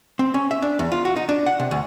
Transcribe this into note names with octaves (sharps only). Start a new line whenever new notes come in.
C4
C#4
E5
D4
E2
F4
F#4
D#4
D4
F#5
C3
D2